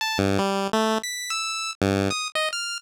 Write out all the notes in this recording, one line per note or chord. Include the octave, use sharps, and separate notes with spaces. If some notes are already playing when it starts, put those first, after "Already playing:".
A5
G2
G3
A3
B6
E6
G2
D#6
D#5
F6